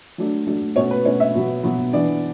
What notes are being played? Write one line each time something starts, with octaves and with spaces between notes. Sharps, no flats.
F#3 A3 D4
F#3 A3 D4
B2 A3 C#4 C#5
B4
B2 A3 C#4 C#5
E5
B2 F#3 B3
B2 F#3 B3
E3 B3 D4 D5